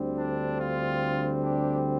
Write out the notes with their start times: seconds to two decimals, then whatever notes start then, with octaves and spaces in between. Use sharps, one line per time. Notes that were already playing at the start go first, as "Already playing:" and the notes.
Already playing: D2 D3 G3 C4
0.17 D4
0.59 F4
1.41 D4 G4